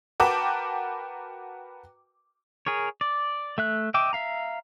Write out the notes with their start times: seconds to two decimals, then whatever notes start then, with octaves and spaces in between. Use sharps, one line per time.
0.20 F#4 A#4 B4 G5 A5 D6
2.66 G#4 A#4 C#5
3.01 D5
3.58 A3 E5 F#6
3.94 D#5 E5 G5 D6
4.13 E5 F5 A#5